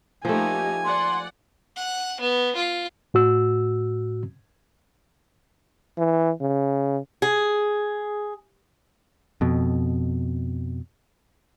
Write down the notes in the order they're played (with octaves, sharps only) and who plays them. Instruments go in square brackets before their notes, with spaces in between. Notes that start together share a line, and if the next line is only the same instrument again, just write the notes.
[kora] F3 A3 [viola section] A#3 D#4 G4 [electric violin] G#5
[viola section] D5 F#5 [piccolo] C6
[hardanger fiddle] F#5
B3
F4
[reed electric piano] A2 F#4 E6
[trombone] E3
C#3
[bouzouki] G#4
[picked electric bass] F2 B2